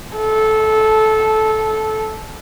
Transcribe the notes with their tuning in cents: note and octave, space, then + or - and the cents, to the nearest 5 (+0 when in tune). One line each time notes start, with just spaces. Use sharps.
A4 -15